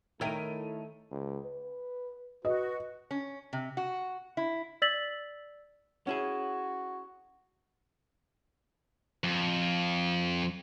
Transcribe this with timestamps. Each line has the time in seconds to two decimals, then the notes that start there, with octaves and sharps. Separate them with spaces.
0.21 D#3 A3 E4 A4 A#4 C#5 G5 D#7
1.11 C#2
1.45 B4
2.45 F#4 B4 D#5
3.11 C#4
3.53 C3
3.77 F#4
4.37 E4
4.82 D5 E6 A6 B6 F#7
6.07 C#4 E4 F#4 G#4
9.24 F2